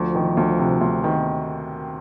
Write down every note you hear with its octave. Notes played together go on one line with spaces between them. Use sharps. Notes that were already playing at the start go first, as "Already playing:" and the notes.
Already playing: D2 F3
D#3
D2
C3
D2
D#3